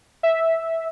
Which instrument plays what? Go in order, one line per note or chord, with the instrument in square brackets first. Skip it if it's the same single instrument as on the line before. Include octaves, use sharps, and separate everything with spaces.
[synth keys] E5